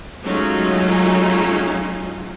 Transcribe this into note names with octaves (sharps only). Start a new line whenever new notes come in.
F#3 G#3 A3 C#4 D#4 F4